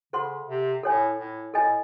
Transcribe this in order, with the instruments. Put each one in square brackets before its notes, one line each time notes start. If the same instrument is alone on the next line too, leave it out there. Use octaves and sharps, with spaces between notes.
[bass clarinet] C#3 [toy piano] A4 C5 F#5 C6
[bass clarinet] C3
[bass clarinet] A2 [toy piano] A4 C#5 G#5
[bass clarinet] A2
[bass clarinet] A2 [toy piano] A4 D#5 G#5